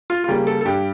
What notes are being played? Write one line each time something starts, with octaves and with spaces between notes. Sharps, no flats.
F4
F4
C#3 G3 A#3 G4
A4
A4
G2 G4